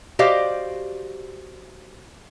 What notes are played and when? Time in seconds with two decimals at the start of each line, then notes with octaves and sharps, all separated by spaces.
0.19 F#4 G4 C5 D5 D#5 F5